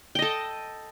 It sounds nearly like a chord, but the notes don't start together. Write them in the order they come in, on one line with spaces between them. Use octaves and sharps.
G5 D#5 A4